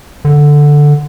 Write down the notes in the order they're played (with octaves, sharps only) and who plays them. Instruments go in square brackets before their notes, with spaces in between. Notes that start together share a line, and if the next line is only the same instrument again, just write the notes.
[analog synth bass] D3